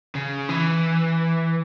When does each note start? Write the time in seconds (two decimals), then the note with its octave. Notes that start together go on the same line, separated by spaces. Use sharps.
0.15 C#3
0.49 E3